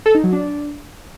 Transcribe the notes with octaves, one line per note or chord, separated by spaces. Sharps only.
A4
D#4
F#3
D4